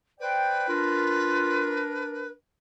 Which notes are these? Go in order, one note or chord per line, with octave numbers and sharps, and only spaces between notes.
B4 C5 D5 G5
D4 F4 A#4